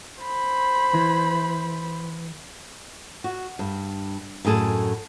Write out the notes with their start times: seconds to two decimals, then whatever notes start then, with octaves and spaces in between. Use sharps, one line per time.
0.22 C5 B5
0.94 E3
3.24 F#4
3.59 G2
4.45 F#2 A2 G#4 A4